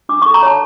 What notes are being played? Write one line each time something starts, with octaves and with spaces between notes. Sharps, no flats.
D4 D6
C#6
A4
A#5
C#5 A5